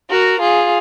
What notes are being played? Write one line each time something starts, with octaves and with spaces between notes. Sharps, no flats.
F#4 A#4
F4 G#4